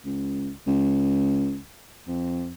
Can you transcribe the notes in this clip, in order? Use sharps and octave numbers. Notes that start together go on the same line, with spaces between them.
C#2
C#2
F2